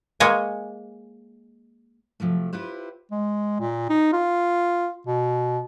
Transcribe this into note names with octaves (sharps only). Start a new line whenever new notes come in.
G#3 A#3 C#5 D#5 G#5
C3 F3 F#3 A3
E4 F4 G4 B4 C5
G#3
A#2
D#4
F4
B2